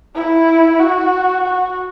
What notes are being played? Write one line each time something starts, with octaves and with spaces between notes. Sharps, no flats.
E4
F#4
F#4